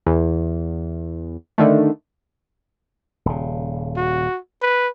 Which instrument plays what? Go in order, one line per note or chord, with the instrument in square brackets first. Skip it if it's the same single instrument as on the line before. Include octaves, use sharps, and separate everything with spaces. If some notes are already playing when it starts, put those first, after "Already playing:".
[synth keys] E2
D3 D#3 A3
[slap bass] D#1 C#3
[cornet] F#4
B4